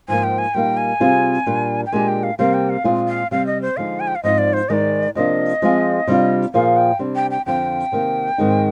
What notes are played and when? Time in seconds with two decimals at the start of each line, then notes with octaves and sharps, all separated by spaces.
0.08 G#2 F3 A#3 G#5
0.24 G5
0.38 G#5
0.54 A#2 G3 A#3 D#4 G5
0.77 G#5
1.00 C3 G3 C4 F4 G#4
1.46 A#2 G3 D4
1.86 G5
1.92 A#2 G#3 D4 G4 G#5
2.08 G5
2.23 F5
2.39 C3 G3 A#3 F5
2.54 G5
2.70 F5
2.84 A#2 G#3 C4 F4 G#4
3.08 F5
3.31 C3 G3 C4 F5
3.47 D#5
3.62 C5
3.77 D3 F3 G#3 D#4 F5
4.00 G#5
4.07 G5
4.15 F5
4.24 G#2 F3 C4 D#4 D#5
4.38 D5
4.53 C5
4.69 G#2 D#3 G#3 D5 D#5
5.15 C3 F3 A#3 D4 D#5
5.62 F3 G#3 C4 F4 G#4
6.07 C3 G3 D4 F4
6.53 A#2 F3 A#3 F4 G#4 F5
6.77 G5
6.99 C3 G3 D4
7.16 G5
7.31 G5
7.46 F2 D3 F3 C4 G5
7.92 C3 D#3 G3 A#3
8.38 G#2 D#3 G#3 C4 D#4